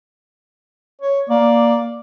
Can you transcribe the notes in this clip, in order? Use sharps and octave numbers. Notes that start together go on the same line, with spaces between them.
C#5
A#3 D5